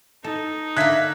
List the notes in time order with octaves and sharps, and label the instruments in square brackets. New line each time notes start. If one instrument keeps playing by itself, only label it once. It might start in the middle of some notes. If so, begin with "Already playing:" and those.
[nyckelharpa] D#4 [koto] A4
[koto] D3 A#3 [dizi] E5 [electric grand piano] F#6 G#6 B6